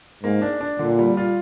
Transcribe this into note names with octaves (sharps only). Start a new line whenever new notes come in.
G#2 A#3
D4
D4
A#2 D3
G3
F4